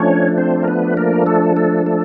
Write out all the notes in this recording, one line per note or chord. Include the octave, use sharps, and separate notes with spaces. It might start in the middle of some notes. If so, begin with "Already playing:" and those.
Already playing: F3 A3 C#4 D4 C#5
C4 C5
A#4
B3 B4
A#3 A#4
A3 A4
A3 A4
A3 A4